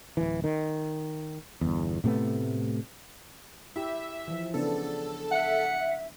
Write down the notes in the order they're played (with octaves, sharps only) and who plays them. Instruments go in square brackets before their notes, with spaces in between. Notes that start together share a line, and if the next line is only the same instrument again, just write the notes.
[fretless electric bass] D1 E3
D#3
G1 E2
A2 C3 A3 B3
[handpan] E4 G4 [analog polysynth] E5
[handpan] E3 F3
[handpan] C#3 B3 D4 [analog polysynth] A4
[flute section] E5 [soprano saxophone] F#5